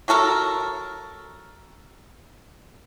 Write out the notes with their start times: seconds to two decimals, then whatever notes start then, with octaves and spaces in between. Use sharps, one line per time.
0.08 F#3 F#4 A4 A#4